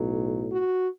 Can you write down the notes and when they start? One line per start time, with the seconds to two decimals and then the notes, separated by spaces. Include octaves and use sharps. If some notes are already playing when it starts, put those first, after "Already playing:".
Already playing: B1 A2 F#3
0.51 F#4